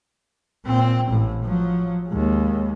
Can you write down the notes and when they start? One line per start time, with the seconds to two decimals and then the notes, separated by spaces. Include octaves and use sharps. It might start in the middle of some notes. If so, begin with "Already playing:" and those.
0.65 A#2 C4
1.10 A1 A2
1.45 F3 F#3
2.08 D#2 G#3